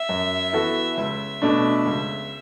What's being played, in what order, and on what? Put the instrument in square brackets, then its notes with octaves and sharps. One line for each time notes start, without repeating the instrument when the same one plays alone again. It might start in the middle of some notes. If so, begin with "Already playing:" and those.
Already playing: [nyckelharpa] E5
[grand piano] F#2
E3 B3 F#4 A4
[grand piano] C#2 [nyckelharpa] E5
[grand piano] B2 A3 D4
C#2